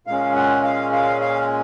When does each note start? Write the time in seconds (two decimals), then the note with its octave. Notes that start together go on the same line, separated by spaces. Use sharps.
0.07 A#2 G#3 C#4 F5
0.35 F#5
0.63 F5
0.93 F5
1.21 F5